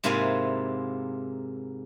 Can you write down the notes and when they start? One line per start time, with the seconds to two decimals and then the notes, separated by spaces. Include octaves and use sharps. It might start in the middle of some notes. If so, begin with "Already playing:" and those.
0.04 G#2 C3 A#3 E4 F4 G#5